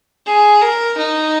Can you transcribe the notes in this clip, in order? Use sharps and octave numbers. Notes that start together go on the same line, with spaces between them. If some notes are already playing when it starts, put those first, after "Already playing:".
G#4
A#4
D#4